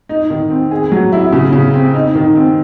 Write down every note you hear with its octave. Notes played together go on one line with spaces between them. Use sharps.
D#4
D#3
C4
G#4
F#3
E4
C#3
C#3
C4
D#4
D#3
C4